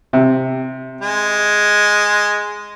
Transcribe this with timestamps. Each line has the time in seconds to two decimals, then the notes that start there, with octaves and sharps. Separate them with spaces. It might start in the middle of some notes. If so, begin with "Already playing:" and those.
0.13 C3
1.01 G#3